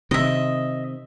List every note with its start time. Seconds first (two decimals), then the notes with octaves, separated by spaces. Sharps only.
0.11 C3 D#3 D#5 E5